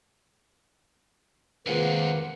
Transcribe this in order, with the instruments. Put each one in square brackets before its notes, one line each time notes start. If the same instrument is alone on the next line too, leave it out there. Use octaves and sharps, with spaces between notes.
[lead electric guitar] C3 F3 [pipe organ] D#3 F#5 [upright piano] G#3 A#3 F4 [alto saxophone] B4